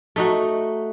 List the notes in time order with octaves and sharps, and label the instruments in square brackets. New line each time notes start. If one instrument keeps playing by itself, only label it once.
[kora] A3 D#4 F#4